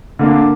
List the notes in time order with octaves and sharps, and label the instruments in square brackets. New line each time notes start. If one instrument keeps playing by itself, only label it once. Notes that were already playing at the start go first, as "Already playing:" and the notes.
[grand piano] D3 A#3 D4